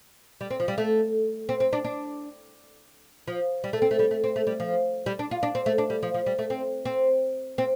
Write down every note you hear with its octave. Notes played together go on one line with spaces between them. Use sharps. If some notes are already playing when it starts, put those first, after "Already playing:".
G3
C4
F3
G3
A3
C4
C4
D4
D4
F3
G3
A3
C4
A3
G3
A3
C4
A3
G3
F3
G3
D4
F4
D4
C4
A3
D4
G3
F3
F3
G3
A3
C4
C4
C4